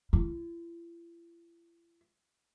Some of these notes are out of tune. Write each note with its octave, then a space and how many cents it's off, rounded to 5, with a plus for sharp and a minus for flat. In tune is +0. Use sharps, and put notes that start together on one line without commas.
E4 +45